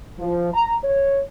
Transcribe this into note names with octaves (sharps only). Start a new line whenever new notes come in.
F3
A#5
C#5